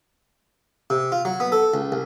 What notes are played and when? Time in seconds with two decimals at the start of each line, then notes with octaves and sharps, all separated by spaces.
0.90 C3
1.12 F4
1.25 F#3
1.40 B3
1.52 A4
1.74 C#2
1.92 C2